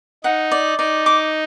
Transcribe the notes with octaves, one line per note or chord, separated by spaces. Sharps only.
D#4 F#5
D5
D#4 D5
D6